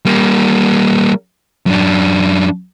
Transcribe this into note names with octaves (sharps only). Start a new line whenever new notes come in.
G3 A#3
F#2 D4